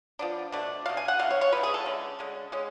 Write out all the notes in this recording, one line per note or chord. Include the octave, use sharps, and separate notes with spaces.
F3 B3 D4
B2 A3 D4
B2 A3 D4 F5
G#5
F#5
B2 A3 D4 F5
C#5
C#5
B2 A3 D4 B4
G#4
A4
D3 G#3 C#4
D3 G#3 C#4
D3 G#3 C#4